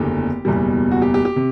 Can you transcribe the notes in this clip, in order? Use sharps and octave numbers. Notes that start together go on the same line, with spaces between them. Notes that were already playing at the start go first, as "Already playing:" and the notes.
Already playing: F#1 E2 D3 A3 G4
F#1 E2 B2 G3
F#4
G4
G4
G4
C3